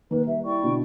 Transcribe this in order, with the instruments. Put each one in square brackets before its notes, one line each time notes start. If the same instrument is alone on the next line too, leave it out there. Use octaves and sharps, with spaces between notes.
[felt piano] D#3 A#3 [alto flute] B4
[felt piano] G3 [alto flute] E5
[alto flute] E4 [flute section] D5 G5 C#6
[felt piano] B2 D3